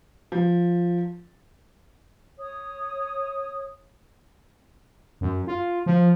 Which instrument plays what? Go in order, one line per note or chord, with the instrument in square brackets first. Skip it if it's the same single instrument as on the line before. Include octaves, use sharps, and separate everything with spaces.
[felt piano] F3
[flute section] C#5 D#6
[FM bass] F#2
F4
F3